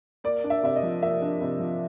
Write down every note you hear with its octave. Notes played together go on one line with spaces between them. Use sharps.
A#3 D5
D4
E5
C3 E5
D#5
F3
A#3 E5
D4
C3
F3